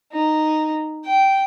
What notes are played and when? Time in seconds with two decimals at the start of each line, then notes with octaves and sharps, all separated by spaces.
0.12 D#4
1.05 G5